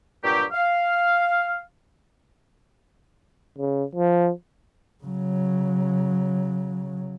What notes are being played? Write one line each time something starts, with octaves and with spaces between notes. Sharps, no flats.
G2 A#2 F#3 G4
F5
C#3
F3
C#3 F#3